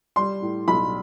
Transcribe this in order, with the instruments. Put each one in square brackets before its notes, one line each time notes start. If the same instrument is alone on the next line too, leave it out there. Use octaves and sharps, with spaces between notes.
[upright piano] G3 C6
A2
B1 B5